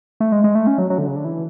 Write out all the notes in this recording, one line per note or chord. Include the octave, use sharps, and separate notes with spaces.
A3
G#3
G#3
A3
C#4
F#3
F#3
D3
C#3
D3
E3